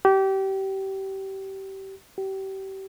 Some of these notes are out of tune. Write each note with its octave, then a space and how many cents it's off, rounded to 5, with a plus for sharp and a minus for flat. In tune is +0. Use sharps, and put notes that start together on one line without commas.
G4 -25
G4 -30